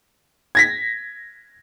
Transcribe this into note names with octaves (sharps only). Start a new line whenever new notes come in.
G#6 A#6 B6